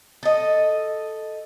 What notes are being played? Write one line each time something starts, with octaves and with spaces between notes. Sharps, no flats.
A4 D#5